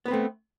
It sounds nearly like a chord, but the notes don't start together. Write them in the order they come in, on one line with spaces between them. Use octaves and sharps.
B3 B4 C4 A3